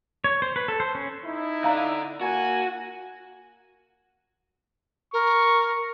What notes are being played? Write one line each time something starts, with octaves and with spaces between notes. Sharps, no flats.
C#5
C5
B4
A4
C5
C#4
D#4 E4
D3 D4 F5 A#5
A#3 F#4 F#5 G#5
A#4 C#6